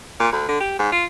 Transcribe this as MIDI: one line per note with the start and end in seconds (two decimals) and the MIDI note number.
0.20 0.32 46
0.32 0.47 38
0.49 0.60 50
0.61 0.77 67
0.79 0.92 44
0.92 1.05 65